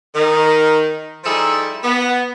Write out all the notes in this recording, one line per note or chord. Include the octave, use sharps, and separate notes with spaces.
D#3
F3 G3 D#4 E4 G#4 A4
B3